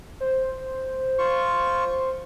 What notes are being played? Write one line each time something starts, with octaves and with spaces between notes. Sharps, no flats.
C5
F4 C#6